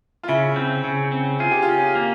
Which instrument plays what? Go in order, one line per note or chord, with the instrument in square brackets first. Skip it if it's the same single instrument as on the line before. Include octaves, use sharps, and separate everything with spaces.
[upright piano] F4
[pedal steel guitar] C#3 [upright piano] E4
[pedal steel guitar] C4
C#3
C4
[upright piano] F4 [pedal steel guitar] G#4
[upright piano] G4
F4
[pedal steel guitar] C#4
A#3